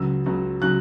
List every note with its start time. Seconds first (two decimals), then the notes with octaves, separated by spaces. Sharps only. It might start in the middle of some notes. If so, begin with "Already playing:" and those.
Already playing: C#2 C#3 F#3 E6
0.26 C#2 C#3 F#3
0.62 C#3 F#3 F#6